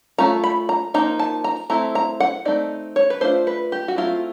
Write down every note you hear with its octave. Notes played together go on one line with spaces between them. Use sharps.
A3 C#4 F4 A#5
B5
A#5
F3 A#3 D#4 A#5
A5
A#5
A3 C4 E4 A#5
A#5
F#5
A3 C4 D#4 D5
C#5
B4
A3 D4 F4 C5
B4
G4
F#4
F#3 A3 C4 E4 F4